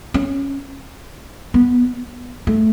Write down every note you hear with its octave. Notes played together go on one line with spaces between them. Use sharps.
C#4
B3
A3